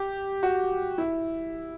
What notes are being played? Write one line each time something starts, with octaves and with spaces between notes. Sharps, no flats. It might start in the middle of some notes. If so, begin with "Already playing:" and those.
Already playing: G4
F#4
E4